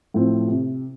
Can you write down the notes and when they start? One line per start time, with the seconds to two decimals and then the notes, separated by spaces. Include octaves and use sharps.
0.14 A2 F3 C4
0.48 C3